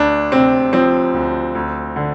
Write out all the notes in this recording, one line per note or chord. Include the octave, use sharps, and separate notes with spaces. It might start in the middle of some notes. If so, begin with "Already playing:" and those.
Already playing: D2 D4
C3 C4
F3 C4
D2
D2
D3